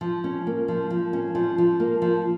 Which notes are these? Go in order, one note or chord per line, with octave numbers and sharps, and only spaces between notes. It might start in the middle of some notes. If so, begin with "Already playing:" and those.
F3
C#4
A#3
F3
F3
C#4
F3
F3
A#3
F3